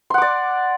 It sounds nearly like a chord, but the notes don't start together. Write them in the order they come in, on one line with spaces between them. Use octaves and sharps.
C6 F#5 D6 D5